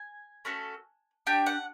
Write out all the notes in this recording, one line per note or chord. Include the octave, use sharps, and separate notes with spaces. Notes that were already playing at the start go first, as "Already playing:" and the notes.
Already playing: G#5
A3 C#4 F#4 A4
D4 G4 G5
F#5